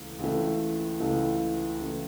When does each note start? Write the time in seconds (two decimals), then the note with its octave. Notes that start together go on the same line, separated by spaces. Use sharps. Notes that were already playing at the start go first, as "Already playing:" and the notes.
Already playing: C#2 C#3 E3 A3
0.19 C#2 C#3 E3 A3
1.00 C#2 C#3 E3 A3
1.80 C#2 C#3 E3 A3